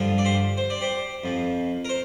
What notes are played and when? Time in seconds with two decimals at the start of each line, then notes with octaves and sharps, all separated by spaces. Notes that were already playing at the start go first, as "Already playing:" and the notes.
Already playing: G2 D3 F3
0.18 D5
0.25 G4 C5
0.57 C5
0.70 D5
0.81 G4 C5
1.24 F2 F3
1.85 A#4
1.89 C5